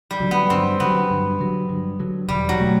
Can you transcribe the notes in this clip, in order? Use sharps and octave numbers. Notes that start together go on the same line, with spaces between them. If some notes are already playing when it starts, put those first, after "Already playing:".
G3
D3 F#3
B3
G2 C4
D3 F#3 B3
G2
D3 F#3
G2
D3 F#3
E1 G3
F#3
B2 A3